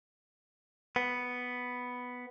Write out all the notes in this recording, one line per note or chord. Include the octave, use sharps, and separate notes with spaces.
B3